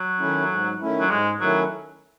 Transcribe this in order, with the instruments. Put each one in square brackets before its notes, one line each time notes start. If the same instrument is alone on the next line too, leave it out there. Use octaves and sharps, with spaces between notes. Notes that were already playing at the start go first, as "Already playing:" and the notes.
Already playing: [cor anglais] F#3
[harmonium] D#3 A3 C#4 E4
G#2
D#3 A3 C#4 E4
[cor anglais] F#3
[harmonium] G#2 [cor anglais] G#3
[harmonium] D#3 A3 C#4 E4 [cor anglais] F#3